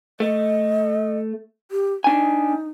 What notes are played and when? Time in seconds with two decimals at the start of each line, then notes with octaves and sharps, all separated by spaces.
0.20 A3 D#5
1.71 G4
2.04 D4 D#4 G#5